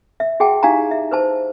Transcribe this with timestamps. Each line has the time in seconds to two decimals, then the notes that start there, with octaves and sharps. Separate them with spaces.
0.20 E5
0.40 F#4 G#4 F#5 G5 A5
0.63 D#4 E4 G4 F5 G#5 A#5
0.91 E5
1.11 B4 C5 A5